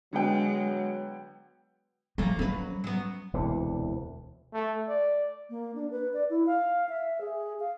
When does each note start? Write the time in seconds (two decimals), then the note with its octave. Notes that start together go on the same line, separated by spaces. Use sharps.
0.13 D3 F#3 G#3 B3 D4 F#4 G5
2.18 F3 A3 A#3
2.39 F#3 C#4 B4
2.84 F#3 B3
3.33 E1 D2 C3 E3
4.53 A3
4.88 D5
5.50 A#3
5.75 D4
5.91 B4
6.13 D5
6.30 E4
6.47 F5
6.89 E5
7.21 G#4
7.60 F5